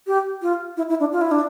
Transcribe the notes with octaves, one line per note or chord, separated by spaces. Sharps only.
G4
F4
E4
E4
D4
F4
E4
D4